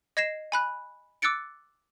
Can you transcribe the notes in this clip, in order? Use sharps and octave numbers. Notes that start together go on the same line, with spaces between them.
D#5 G#6 A#6 C7 E7
G#5 B5 F#6
D6 E6 F#6 A6 C#7 D7